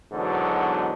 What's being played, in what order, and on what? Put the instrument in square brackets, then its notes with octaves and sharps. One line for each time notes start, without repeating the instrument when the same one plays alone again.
[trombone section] E2 G#2 B2 D3 F#3